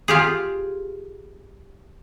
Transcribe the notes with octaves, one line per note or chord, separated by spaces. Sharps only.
F4 G4 G#4